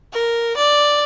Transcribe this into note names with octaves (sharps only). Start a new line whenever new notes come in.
A#4
D5